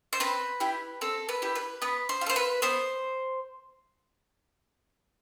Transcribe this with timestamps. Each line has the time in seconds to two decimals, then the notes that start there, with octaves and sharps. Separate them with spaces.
0.13 C5
0.20 C4 B4
0.60 E4 G4
1.01 C4 A4
1.29 B4
1.42 E4 G4
1.55 B4
1.82 B3 B4
2.09 C5
2.21 F4
2.26 A4
2.29 C5
2.36 B4
2.62 B3 C5